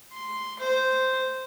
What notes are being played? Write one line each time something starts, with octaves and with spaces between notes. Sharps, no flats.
C6
C5